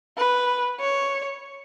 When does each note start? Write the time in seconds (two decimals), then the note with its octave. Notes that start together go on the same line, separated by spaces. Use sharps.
0.18 B4
0.80 C#5